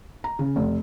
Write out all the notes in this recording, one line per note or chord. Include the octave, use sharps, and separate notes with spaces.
A#5
C#3
F1